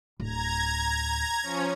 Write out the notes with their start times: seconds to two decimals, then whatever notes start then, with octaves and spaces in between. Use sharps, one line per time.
0.20 D1 A#5 G#6
1.42 F3 C#4 C#5